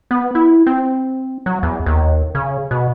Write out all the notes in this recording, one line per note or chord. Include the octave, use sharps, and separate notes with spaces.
B3
E4
C4
F#3
E2
D#2
C#3
B2